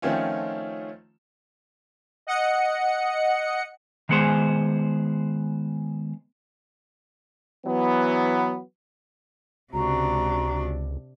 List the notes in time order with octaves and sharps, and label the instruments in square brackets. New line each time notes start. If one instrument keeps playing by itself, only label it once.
[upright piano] D#3 F3 A3 C4 C#4 F4
[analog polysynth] D#5 F#5 C#7
[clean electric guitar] D#3 G#3 B3 G#4 C5
[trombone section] E3 F#3 B3
[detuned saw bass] C#2 [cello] C3 D4 [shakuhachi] F#4 [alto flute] A#5